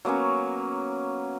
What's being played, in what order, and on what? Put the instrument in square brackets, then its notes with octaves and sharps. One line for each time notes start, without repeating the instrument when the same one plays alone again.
[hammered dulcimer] F#3 A#3 B3 C#4